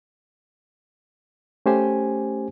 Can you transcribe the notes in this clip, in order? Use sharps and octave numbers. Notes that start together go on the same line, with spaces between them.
A3 C#4 G4 C5 G#5